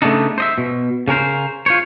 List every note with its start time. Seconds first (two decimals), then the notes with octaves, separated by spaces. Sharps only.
0.02 C#3 A3 B3 C4 D4 D#4
0.38 C5 D#5 E5
0.58 B2
1.08 C#3 C#4 A#4 C5
1.66 F4 C5 C#5